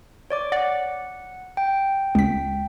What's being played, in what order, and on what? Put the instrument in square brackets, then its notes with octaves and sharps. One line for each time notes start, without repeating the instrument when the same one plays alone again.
[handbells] C#5 D5 D6
[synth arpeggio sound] D5 [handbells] F#5
[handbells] G5
[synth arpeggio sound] C#2 B6